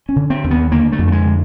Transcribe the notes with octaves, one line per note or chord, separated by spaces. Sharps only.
C#4
D3
C4
D#2
B3
D3 A#3
A3
F2
A3
G#3
D3